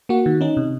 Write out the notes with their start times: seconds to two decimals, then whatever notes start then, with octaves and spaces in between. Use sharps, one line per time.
0.09 A#3 F#4
0.26 D#3
0.41 C#4 D#4
0.57 C3